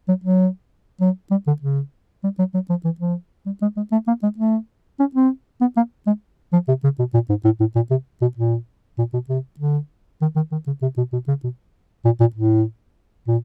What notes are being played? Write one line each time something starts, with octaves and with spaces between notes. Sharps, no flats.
F#3
F#3
F#3
G3
D3
C#3
G3
F#3
F#3
F3
E3
F3
G3
G#3
G#3
A3
A#3
G#3
A3
C#4
C4
B3
A#3
G#3
F3
C3
C#3
B2
A#2
G#2
A2
A2
A#2
C3
B2
A#2
A#2
B2
C3
D3
D#3
D#3
D#3
C#3
C3
B2
B2
C#3
B2
A#2
A#2
A2
A#2